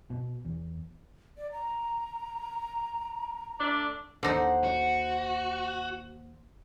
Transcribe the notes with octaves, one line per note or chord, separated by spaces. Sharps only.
B2
E2
D5
A#5
A3 D4
D#2 D3 D#4 C5 F#5
F#4